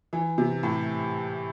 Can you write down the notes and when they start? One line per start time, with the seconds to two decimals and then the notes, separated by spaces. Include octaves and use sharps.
0.13 E3
0.38 C3
0.63 A2